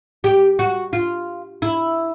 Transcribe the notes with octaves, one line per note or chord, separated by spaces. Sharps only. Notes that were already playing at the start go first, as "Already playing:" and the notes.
G4
F#4
F4
E4